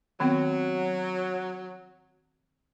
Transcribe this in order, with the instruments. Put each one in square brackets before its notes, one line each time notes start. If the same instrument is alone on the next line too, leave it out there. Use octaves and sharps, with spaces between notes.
[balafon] D#3 B3 C4 [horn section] F#3